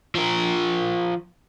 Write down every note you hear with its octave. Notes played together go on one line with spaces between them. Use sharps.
F3 A#4